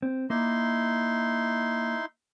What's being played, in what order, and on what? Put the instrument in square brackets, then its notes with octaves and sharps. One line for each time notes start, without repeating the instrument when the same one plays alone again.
[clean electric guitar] C4
[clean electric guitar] A#3 [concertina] D#4 E4 C6